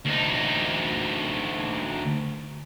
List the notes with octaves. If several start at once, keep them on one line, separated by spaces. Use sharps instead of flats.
D2 D#4